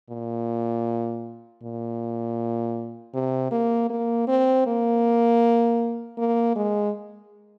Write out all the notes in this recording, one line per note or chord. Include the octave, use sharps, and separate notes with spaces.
A#2
A#2
C3
A#3
A#3
C4
A#3
A#3
G#3